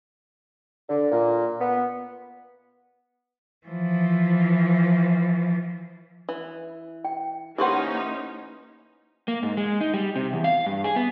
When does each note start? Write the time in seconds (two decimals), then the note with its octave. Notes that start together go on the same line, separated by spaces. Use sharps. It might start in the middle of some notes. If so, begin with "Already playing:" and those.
0.89 D3
1.11 A#2
1.60 B3
3.67 E3 F3
6.29 E3
7.05 G5
7.58 E3 A#3 C#4 D#4 G4 B4 C5 F#5
9.28 A#3
9.43 G#2
9.57 G#3
9.81 D#4
9.94 G3
10.16 C3
10.33 E2
10.44 F5
10.66 G2
10.84 G#4
10.96 B3